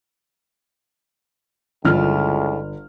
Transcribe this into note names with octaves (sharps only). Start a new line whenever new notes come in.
G1 C#2 E4 F4 A4 F6